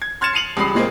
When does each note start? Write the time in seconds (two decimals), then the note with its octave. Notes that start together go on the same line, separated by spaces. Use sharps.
0.02 G#6
0.21 C6 F6 G#6 A6 C#7 E7
0.33 C7 C#7 D#7 F7 F#7
0.57 C#2 G3 B5 D#6 C7
0.75 A#2 G#3 A#3 C4